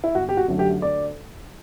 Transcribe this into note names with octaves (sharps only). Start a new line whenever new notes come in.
E4
G1 F#4
G4
F#4
F#2 D3 F#3 A3
G4
D2 D5